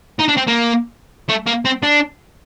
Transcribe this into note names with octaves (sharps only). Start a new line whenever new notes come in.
D#4
D4
C4
A#3
A3
A#3
C4
D4